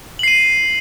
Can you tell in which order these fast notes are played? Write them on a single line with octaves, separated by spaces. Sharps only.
F#7 C7 D#7